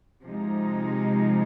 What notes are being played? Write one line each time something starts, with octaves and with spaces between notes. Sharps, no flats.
C3 F3 G#3 D#4